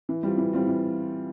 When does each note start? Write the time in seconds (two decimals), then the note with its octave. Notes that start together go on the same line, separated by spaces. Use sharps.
0.09 E3
0.23 G3 C4 F4
0.38 E3
0.53 G3 C4 F4
0.67 E3